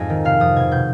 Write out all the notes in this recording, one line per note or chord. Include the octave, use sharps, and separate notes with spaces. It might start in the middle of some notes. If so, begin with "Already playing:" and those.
Already playing: F2 G#2 D#5 G#5
D#3
C3 F5
F2 D#6
B2 G#6
B2 G6